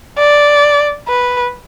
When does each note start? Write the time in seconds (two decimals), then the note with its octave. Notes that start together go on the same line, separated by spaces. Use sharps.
0.18 D5
1.08 B4